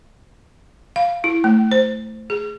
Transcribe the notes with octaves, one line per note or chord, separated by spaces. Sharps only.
F5
E4
A3
C5
G#4